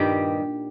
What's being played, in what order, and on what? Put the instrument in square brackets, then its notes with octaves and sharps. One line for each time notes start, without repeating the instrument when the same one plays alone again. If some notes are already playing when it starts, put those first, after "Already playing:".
Already playing: [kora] G2 A#2 D#3 G3 G4